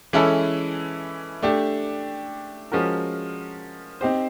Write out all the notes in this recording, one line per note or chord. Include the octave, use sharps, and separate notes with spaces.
E3 G#3 C#4 E4 A4
A3 D4 G4
F3 G#3 C#4 F#4 A#4
C4 D#4 G4 C5